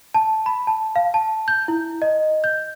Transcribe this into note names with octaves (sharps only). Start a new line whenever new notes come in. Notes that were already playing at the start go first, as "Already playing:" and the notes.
A5
B5
A5
F5
A5
G6
E4
D#5
G6